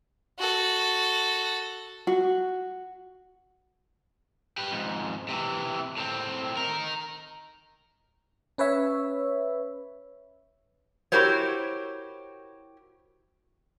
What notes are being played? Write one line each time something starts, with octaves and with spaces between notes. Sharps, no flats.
F#4 A4
F#4
G4 B4
F2 G#2
C3 E3
A2 C4
D#4 A#4
C#4 B4 C#5 E5
E4 F#4 G4 A#4 C5 C#5